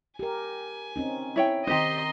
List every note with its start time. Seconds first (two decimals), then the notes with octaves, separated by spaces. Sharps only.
0.19 G4 A#4 G#5
0.96 C4 C#4 D#4
1.36 E4 C#5 G5
1.67 D#3 C4 D#4 G4 C5 D#5 A#5 C6